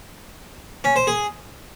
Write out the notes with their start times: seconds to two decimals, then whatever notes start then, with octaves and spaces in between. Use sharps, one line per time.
0.84 C#4
0.96 C5
1.07 G#4